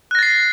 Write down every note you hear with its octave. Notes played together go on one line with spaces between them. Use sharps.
F#6 A6 A#6 C7